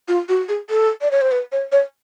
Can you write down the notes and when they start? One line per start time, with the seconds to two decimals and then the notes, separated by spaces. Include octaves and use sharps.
0.08 F4
0.29 F#4
0.49 G#4
0.70 A4
1.02 D5
1.11 C#5
1.21 C5
1.32 B4
1.52 C#5
1.72 C#5